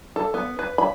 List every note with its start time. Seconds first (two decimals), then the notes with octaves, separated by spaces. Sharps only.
0.16 A4
0.34 B3
0.59 B4
0.78 B5